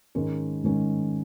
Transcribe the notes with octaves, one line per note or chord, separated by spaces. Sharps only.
G#2 D#3 G#3 C#4 A#4
G#2 D#3 G#3 C#4 A#4